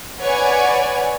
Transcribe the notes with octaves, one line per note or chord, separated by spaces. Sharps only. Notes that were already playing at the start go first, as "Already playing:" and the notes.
B4 C#5 D5 F#5 G#5